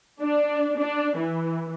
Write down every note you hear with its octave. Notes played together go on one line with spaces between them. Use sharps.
D4
D4
E3